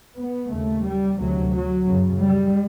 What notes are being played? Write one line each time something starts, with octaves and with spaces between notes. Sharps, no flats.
B3
D#2 C#3 A3
G3
D2 C3 F#3
F#3
F#2 C#3
G3